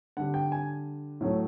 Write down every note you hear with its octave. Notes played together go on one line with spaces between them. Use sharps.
D3 G3 F#5
G5
G#5
A2 F#3 A3